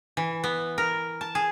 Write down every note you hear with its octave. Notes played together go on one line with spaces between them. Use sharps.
E3
B3
A#4
A5
G#4